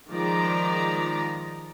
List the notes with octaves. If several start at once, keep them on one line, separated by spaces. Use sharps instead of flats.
D#3 F3 G#3 D5 A#5